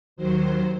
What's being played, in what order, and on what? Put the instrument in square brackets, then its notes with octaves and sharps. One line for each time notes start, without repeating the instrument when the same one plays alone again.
[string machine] D#2 D#3 F#3 C5